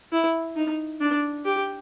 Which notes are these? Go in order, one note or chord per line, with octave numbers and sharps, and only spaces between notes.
E4
D#4
D4
G4